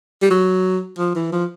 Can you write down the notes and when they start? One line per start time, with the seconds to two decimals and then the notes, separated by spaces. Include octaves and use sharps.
0.22 G3
0.30 F#3
0.98 F3
1.15 E3
1.32 F3